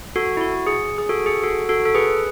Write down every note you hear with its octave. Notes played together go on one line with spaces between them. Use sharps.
F#4 A4
E4
F#4
G#4
G#4
F#4 A4
G#4
F#4 A4
F#4 A4
A4
G#4 B4